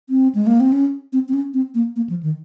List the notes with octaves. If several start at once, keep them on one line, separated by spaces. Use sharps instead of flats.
C4
G#3
A#3
C4
C#4
C4
C4
C#4
C4
A#3
A#3
F3
D#3